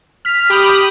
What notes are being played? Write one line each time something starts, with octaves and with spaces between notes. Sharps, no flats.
F6 B6
G4 B5 D#6